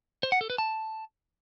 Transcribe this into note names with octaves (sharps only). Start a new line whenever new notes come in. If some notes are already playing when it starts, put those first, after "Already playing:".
C5
F#5
A4
B4
A5